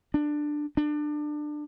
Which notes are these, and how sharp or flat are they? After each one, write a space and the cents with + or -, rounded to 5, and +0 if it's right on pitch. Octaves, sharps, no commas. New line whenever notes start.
D4 +15
D4 +25